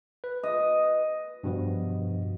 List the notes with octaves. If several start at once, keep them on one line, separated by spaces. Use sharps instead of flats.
B4
D#5
G2 B2 F3